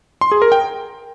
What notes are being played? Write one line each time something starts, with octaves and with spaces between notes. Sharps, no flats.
C6
G#4
A#4
G5